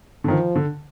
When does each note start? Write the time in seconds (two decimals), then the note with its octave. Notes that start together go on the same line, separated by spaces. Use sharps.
0.24 D3
0.28 D#3 F3
0.55 D3